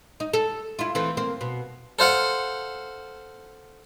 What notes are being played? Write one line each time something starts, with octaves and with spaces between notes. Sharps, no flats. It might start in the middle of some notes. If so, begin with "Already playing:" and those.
D#4
A4
E4 F4
E3 A3 C4
A#3 C4
B2
A4 C5 F5 F#5